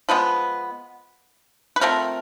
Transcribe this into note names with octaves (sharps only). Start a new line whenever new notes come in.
F3 G#3 B3 B4
B4
F3 A3 C4 A#4